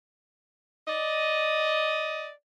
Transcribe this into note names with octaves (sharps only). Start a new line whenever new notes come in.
D5 D#5